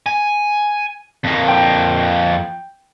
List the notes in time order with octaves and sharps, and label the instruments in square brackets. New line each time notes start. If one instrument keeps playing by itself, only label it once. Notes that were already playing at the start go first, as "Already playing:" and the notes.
[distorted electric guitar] G#5
F2 A#3
[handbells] G5